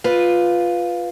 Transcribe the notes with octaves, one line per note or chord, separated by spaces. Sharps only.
F4 B4